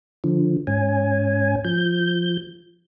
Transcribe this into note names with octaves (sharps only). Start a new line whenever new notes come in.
D3 F3
G#2 C#4 G#5
F3 G6